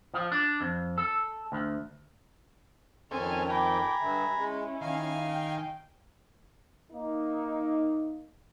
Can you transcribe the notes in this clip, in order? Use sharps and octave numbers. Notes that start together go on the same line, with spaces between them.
F3
D4
F2
A4
D2
F2 D#3 C4 C#4 A4 G#5 F6
G5 G#5 A#5 B5 D6
G2 D3 E5
G#3 C#4 E4
D#3 F5 G#5
G5
A#3 D#4